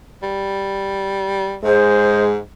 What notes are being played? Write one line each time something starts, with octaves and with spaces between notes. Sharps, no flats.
G3
G#2 G#3 C5